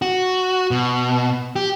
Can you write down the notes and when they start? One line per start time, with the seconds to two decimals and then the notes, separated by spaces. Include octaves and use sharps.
0.02 F#4
0.71 B2
1.56 G4